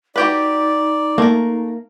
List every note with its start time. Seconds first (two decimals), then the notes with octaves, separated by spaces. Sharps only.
0.16 D#4 F#4 G4 B4 D5
1.18 A3 A#3 A#4